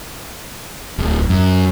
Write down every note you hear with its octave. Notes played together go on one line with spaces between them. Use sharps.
D1
F#2